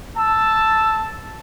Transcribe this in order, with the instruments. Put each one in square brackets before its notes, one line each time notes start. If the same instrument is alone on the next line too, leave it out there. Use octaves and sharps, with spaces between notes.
[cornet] A5 [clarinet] E6